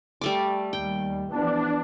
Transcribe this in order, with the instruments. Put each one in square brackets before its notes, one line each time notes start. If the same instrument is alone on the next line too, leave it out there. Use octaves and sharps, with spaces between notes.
[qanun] G3 A3 D6
[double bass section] D#2 G3 [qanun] G5
[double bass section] E3 F3 B3 [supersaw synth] D4